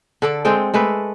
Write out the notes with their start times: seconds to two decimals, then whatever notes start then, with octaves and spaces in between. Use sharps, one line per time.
0.22 D3 A4 D5
0.45 G#3 C4 A4 G5
0.74 G#3 A3 A4 B4